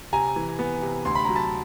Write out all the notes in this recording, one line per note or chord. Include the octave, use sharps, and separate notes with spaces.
C3 G#5 A#5
E3
B3
C3
D2 C6
B5
F#3 A#5
A5 B5